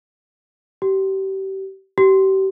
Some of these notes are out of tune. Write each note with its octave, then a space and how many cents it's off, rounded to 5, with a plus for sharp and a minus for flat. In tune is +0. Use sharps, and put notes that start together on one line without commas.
G4 -30
G4 -35